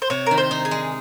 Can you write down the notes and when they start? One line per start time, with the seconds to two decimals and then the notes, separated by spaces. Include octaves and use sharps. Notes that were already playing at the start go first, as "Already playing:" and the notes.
0.02 C5
0.10 C3 C#5
0.26 D#3 A#4
0.38 C5
0.51 D#4
0.65 G#4
0.71 G#3